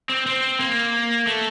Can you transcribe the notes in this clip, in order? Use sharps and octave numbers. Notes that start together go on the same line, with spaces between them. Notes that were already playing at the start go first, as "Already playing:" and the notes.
C4
C4
A#3
A3